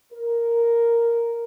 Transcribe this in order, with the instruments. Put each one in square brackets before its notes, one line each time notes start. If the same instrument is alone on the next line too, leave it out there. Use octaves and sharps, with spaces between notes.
[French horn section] A#4